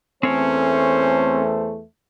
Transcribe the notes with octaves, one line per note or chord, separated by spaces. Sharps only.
E2 A3 C4 C#4 C5 C#5